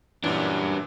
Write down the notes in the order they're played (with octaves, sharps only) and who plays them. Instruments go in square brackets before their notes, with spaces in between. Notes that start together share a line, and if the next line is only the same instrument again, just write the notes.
[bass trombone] F#2 [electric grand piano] A#2 E3 [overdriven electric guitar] G3 D4